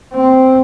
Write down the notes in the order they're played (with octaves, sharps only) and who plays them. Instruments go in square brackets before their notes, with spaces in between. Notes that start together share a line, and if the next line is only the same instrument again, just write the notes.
[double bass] C4